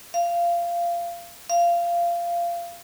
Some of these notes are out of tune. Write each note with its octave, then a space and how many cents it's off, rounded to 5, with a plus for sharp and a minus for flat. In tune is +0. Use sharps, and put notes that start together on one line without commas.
F5 -20
F5 -20